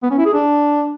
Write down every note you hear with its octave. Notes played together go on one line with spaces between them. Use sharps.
B3
C#4
E4
G#4
D4